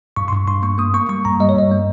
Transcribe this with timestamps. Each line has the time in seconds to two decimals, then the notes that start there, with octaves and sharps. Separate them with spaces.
0.16 G2 C#6
0.28 C6
0.32 G2 C#6
0.48 G2 C6
0.63 A#3 C#6
0.78 A#3 D#6
0.94 A#3 C#6
1.09 G3 C#6
1.25 G2 A#5
1.40 G3 D#5
1.49 C#5
1.55 G2 D#5
1.71 A#3